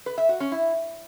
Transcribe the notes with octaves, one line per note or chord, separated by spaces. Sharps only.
B4
E5
F#4
C#4
E4